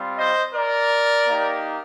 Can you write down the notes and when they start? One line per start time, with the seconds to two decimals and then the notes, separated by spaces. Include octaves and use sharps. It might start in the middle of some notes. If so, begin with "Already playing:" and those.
Already playing: G3 C4 F4
0.17 C5 D#5
0.53 A#4 D5
1.27 A#3 D#4 G4